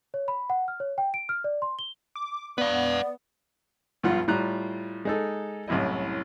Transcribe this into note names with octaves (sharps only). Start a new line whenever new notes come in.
C#5
B5
F#5
F6
C#5
G5
D7
F6
D5
C6
G7
D6
B3 B4 D5 F5
B1 G2 F3 F4 F#5
A2 G3 F4 A#5 F#6
G#3 D#4 A4
C2 F#2 A2 E4 D#5